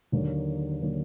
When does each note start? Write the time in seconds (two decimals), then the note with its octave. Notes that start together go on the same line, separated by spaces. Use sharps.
0.12 D#2 D3 F#3 A#3
0.82 D3 F#3 A#3